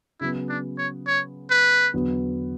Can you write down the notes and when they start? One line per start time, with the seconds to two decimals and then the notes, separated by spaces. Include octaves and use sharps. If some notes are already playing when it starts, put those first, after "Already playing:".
0.21 C#3 F#3 B3 E4
0.49 D4
0.78 C#5
1.07 C#5
1.50 B4
1.94 E2 D3 F#3 B3